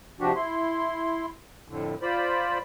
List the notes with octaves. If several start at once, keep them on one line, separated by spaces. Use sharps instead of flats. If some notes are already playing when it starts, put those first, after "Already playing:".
C3 F3 D4 F#4 G4
E4 C6
F2 A2 D3
F4 C5 D5 B5